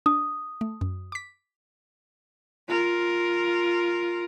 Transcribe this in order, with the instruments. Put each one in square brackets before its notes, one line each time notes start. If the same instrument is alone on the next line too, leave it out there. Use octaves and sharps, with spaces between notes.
[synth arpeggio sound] D4 [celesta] D#6
[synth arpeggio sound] A3
F#2
D6 B6
[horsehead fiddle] F4 A#4